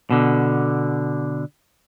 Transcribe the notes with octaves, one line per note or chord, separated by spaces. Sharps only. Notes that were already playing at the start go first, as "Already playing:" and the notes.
B2 D3